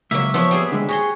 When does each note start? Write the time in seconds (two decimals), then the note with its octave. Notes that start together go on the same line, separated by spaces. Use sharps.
0.11 C#2 F#3 A#3 E5
0.34 F3 B3 C5 C#5
0.51 G3 C4 G#4
0.72 D3 G#3
0.89 F#4 G#4 C#5 C6